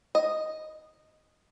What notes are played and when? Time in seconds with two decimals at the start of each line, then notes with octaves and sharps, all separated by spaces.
0.15 D#5